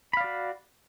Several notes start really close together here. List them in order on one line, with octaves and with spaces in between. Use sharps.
B5 F5 D5 F#4